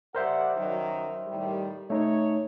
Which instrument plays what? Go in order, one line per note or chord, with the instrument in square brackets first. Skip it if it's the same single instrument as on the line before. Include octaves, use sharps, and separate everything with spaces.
[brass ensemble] G4 D5 F#5 [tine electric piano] A#4 C5 E5
[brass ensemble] F#2 D#3 F#3
A2 D#3 G3
[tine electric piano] A3 D#4 [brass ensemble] C#5